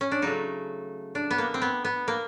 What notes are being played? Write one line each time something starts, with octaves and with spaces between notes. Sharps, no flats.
C#4
D4
C#3 F#3 A3 D#4
D4
B3
A#3
C4
B3
B3
A#3